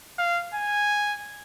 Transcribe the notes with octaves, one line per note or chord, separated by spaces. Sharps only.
F5
G#5